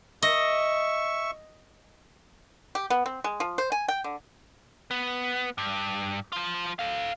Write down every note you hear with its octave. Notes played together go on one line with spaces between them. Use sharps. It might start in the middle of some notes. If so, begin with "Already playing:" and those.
D#5 E5 C#6
G4
B3
C4
G#3
F3
C5
G#5
G5
D3
B3
G2
F3 F4
A4 F5